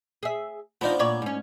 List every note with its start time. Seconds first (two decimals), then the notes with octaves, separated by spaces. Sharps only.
0.23 G#4 E5
0.81 F3 B3 D4 D#4 F4
0.99 A#2 C#5 D5
1.22 G#2 C#4